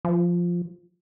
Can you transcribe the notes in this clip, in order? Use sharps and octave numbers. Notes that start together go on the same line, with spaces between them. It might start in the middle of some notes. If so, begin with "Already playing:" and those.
F3